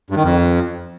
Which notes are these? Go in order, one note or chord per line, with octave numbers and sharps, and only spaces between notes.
G2
D#3
F2